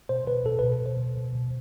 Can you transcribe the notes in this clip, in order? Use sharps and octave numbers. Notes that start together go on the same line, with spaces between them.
B2 C5
B2 B4
B2 A4
B2 B4
B2 C5
B2
B2
B2